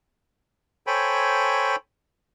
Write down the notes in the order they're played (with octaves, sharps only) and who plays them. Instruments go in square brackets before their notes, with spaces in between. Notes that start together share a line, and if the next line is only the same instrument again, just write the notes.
[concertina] A4 C5 C#5 G5 G#5 B5